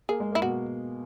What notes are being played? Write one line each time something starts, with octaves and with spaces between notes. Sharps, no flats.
A#3 G#4
G#3
A#3
E4
B2 F#4